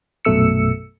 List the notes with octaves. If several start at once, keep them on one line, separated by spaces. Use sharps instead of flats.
A#1 F#2 B2 A3 E6 C#7